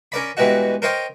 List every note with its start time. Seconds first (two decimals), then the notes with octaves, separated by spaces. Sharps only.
0.12 C#4 A#4 D5 B5
0.37 B2 E3 G3 G#3 F#4
0.82 A#4 C5 C#5 D#5 F5 G5